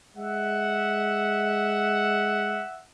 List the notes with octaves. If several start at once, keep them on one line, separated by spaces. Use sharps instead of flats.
G#3 E5 F#5